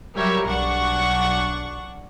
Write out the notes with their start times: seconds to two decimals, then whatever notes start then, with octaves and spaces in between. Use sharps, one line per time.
0.15 F#3 G3 G4 A#4 C#5 E5
0.48 B1 D4 F#5 C#6